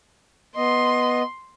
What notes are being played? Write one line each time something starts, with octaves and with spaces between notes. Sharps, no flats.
B3 D#5 C6